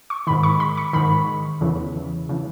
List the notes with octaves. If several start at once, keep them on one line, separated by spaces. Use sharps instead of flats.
C#6
G#2 D#3 B5
C#6
B5
C#6
G#2 D#3 B5
E2 C#3 E3
C#3 E3